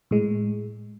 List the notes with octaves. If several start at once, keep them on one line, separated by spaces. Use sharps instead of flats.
A2 G#3